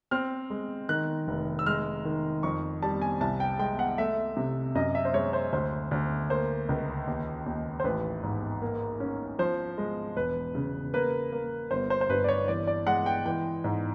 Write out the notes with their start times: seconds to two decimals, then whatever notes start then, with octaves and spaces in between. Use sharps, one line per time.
0.11 C4 F6
0.50 G#3
0.89 D#3 F#6
1.28 F1
1.59 E6
1.66 G#3 F6
2.05 D#3
2.43 F2 C#6
2.82 G3 A5
3.02 G#5
3.21 C2 A5
3.40 G5
3.59 G#3 G5
3.79 F#5
3.98 A3 E5
4.37 C3
4.75 F#2 D#5
4.95 E5
5.05 C5
5.14 G#3 C#5
5.33 C5
5.53 D2 C5
5.91 D2
6.30 A#3 C5
6.69 C#2
7.07 D#2
7.46 D#2
7.80 C5
7.84 A1 B4
8.23 G#2
8.62 A#3
9.00 C#4
9.39 F3 C5
9.78 G#3
10.16 E1 B4
10.55 C#3
10.94 A#3 B4
11.32 A#3
11.71 G1 C5
11.90 C5
12.01 C5
12.09 G2 B4
12.24 D5
12.29 C#5
12.48 E3 D5
12.67 D5
12.87 G#3 F#5
13.06 G5
13.26 E3 G5
13.64 G#2